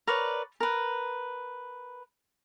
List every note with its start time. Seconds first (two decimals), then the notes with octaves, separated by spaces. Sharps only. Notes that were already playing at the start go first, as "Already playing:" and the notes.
0.07 A#4 B4 C#5 D5
0.60 A#4 B4